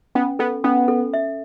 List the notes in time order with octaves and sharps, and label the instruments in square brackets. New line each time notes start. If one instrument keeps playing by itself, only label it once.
[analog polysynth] B3 [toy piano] C#4
[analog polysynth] B3 [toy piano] A4
[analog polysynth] B3 [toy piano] C#4
[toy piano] A4
E5